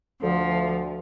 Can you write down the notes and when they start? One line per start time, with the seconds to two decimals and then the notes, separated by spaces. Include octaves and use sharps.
0.23 D2 F3